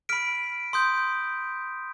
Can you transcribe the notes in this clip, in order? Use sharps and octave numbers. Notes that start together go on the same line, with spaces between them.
B5 F6 B6 D7
C6 D#6 G6